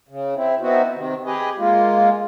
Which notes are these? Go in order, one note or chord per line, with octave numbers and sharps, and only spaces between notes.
C#3
C4 E4
B3 C4 D#4 E4 F#4
C3 D#3
G4 G#4 B4 D#5
G#3 A#3 F4